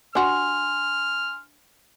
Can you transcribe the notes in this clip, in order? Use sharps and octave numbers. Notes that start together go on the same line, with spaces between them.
D4 F#4 G#5 C6 F6